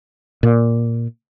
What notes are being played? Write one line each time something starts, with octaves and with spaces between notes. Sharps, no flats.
A#2